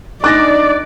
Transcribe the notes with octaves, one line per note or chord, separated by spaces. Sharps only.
D4 D#4 D5 D6 F#6 A6 A#6